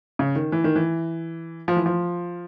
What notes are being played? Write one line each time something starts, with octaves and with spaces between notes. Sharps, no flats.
C#3
D#3
E3
D#3
E3
F3
E3
F3